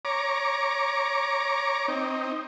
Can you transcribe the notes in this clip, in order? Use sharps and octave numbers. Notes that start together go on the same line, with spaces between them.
C#5 A#5 D6
C4 D#4